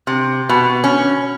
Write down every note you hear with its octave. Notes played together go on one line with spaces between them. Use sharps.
C3
B2
C#4